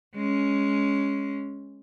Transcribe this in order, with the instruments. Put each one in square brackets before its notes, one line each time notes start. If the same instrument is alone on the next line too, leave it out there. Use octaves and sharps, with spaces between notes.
[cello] G#3 C#4